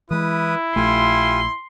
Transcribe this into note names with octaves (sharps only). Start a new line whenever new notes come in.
E3 G#3 E4 B4 D#6
A#1 A3 F4 G4 G#5 C6